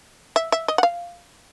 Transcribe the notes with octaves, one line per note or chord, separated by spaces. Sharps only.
E5
E5
D#5
F#5
F5